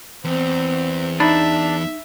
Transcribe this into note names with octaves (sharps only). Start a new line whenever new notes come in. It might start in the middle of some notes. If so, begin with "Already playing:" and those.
E2 C4
D4 D#4 E5 B5